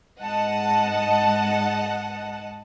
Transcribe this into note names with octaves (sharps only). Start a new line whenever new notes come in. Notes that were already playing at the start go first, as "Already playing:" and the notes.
G#2 D#5 F#5 A5